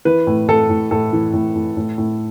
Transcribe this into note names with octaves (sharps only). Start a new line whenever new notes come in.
E3 B4
A2
A2 A4
A2
A2 A4
E3
A2
A2
A2
A2